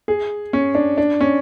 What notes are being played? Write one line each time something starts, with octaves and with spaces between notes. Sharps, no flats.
G#4
C#4
D4
D4
C#4